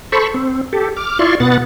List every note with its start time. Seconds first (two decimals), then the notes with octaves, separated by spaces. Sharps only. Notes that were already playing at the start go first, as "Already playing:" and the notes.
0.12 A4 C5 B5 C#6
0.34 C4
0.73 G4 A4
0.97 D6 F6
1.19 E4 F4 D5 C6 C#6
1.40 B2 B3 F#5 A6